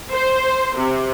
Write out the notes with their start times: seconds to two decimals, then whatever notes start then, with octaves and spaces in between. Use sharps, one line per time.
0.12 C5
0.77 C3